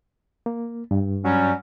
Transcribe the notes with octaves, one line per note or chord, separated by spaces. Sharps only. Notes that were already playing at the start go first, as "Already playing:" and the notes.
A#3
G2
F#3 G3 C#4